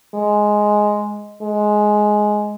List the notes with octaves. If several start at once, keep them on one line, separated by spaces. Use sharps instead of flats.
G#3
G#3